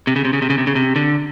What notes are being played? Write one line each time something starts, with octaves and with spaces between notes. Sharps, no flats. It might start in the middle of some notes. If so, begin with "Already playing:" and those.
C3
C#3
C3
C#3
C3
C#3
C3
C#3
C3
D3